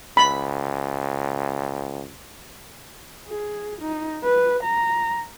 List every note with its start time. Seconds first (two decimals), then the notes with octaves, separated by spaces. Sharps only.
0.17 C#2 B5
3.28 G#4
3.81 D#4
4.24 B4
4.64 A#5